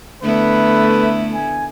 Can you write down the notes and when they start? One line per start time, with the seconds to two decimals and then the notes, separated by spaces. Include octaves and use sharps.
0.23 D3 A3 B3 E4 B4
1.34 G#5